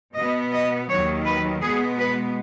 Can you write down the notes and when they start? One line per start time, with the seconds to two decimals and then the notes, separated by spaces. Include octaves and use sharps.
0.15 B2 B3 D#5
0.52 D#5
0.88 D#2 D#3 F#3 C#5
1.25 B4
1.61 B2 G#3 B3 G#4
1.99 B4